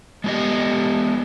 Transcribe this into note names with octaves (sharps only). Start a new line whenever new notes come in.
G#3 B3 D#4 G4 D#5